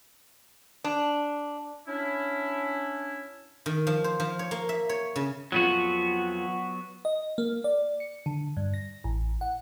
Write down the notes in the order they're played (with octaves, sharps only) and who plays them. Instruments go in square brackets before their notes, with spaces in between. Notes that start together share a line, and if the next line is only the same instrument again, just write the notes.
[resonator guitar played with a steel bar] D4
[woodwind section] C#4 D4 E4
[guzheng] D#3
F3
C5
F3
C#5
A#3
E5
C#5
C#3
[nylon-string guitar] F2 F3 C4 [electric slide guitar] F#3 B3 F#4
[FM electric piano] D#5
A#3
D5
C#7
D3
G2
A#6
A1
F#5